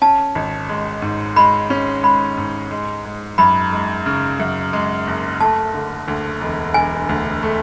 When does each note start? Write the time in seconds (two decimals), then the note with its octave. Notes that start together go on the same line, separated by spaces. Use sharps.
0.02 C#4 A5
0.35 G#1
0.69 G#3
1.02 G#2
1.36 G#3 B5
1.70 C#4
2.03 G#3 B5
2.38 G#2
2.71 G#3
3.05 G#3
3.38 F#2 B5
3.72 G#3
4.06 C#3
4.40 F#2
4.73 G#3
5.07 F#1
5.40 A3 A5
5.74 D3
6.08 D2
6.41 E1
6.74 E1 G#5
7.09 D2
7.43 A3